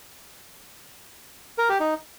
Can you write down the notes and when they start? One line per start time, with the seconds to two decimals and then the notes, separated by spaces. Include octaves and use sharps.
1.58 A#4
1.69 G4
1.80 D#4